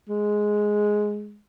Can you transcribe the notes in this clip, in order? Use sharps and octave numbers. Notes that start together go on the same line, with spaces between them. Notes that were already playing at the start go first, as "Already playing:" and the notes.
G#3